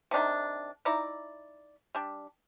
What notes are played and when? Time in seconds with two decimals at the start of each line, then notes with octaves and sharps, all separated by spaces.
0.11 C3 D#3 D4 D#4
0.85 D#4 E4 D5 A#5
1.95 G3 D4